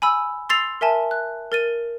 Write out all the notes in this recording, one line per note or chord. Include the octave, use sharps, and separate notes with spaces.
G#5 B5 E6
C6 E6 A6 C7 F7
A#4 E5 G#5 A5
F#6
A#4 A6 D#7